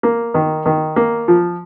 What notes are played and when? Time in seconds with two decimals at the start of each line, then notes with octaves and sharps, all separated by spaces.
0.03 A#3
0.34 D#3
0.66 D#3
0.96 A#3
1.28 F3